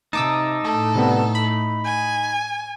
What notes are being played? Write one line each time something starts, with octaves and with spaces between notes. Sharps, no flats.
C3 D#4 A5 D6 E6
A2 A3 A4
C3 G3 B3
B5
G#5